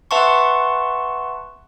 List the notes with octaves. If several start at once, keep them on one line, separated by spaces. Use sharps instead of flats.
B4 E5 F#5 A5 C6 C#6